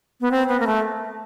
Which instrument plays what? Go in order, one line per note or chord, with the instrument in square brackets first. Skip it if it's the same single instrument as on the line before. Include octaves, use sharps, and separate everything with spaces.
[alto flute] B3
C4
B3
A#3
A3